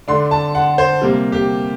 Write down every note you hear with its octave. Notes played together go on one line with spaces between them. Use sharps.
D3 A3 D4 C6
A5
F#5
C5
C3 G3 A#3
G4